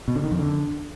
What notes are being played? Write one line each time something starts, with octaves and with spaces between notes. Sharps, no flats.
B2
D3
D#3
F2
D3